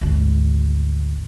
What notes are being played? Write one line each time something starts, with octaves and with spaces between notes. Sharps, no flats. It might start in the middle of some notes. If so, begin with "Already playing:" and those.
G#1 D2